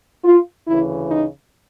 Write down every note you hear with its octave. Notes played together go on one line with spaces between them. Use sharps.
F4
D2 C#3 E3 E4
D#4